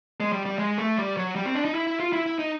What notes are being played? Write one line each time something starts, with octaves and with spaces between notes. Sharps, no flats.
G#3
G3
G3
G#3
A3
G3
F#3
G3
C4
D4
D#4
E4
E4
F4
E4
E4
D#4